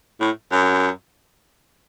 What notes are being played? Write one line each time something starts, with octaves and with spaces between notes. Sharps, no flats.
A2
F#2